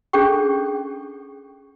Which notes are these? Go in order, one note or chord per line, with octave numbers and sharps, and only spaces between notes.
C#4 D4 G#4 A4 G5 C#6